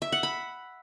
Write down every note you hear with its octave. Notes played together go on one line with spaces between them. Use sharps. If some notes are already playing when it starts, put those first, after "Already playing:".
E5
F#5
B5